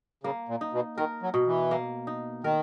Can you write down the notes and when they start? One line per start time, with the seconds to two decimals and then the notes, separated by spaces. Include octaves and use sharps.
0.24 C#3 A#3
0.48 A#2
0.61 D#4
0.73 B2
0.97 D#3 A#4
1.22 F#3
1.34 B2
1.47 E3
1.71 A#3
2.07 D#4
2.44 D#3 A#4